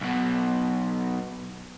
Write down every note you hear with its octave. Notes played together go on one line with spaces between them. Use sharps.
B1 B2